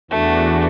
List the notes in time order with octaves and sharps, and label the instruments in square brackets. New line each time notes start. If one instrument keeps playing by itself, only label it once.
[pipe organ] E2 E3 D4 F#4 [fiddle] A3